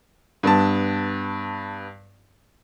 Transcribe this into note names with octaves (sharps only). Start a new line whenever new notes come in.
G2 B3 A5